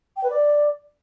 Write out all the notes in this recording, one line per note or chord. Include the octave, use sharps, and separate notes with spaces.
G5
B4
D5